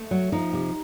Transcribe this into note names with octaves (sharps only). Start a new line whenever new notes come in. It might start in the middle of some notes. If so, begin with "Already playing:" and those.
Already playing: A3
F#3
F3 D#4
C3